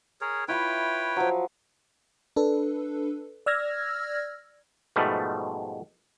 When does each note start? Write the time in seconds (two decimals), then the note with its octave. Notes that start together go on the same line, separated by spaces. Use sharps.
0.21 G#4 A#4 C#5
0.48 E4 F4 B4 C#5 G5 B5
1.16 F3 F#3
2.36 D4 A4 B4
3.46 D5 E6 F6 G#6 A#6
4.96 G#2 B2 F3 G3 A3